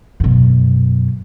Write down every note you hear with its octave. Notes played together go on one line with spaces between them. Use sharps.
F#2 B2